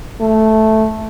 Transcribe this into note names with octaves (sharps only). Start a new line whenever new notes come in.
A3